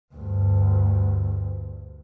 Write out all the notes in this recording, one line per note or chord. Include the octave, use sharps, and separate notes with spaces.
D2 G2